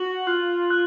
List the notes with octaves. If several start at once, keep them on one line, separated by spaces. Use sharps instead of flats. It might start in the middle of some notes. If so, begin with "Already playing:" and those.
Already playing: F#4 F#7
F4 F#6
F#6